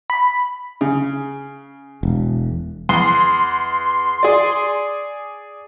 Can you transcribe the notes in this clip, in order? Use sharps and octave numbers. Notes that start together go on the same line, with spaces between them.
B5
C#3
E1
E2 C6
G#4 D5